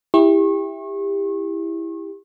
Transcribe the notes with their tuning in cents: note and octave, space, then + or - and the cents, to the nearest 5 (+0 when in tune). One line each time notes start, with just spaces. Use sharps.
E4 +0 G4 +25 C#6 -35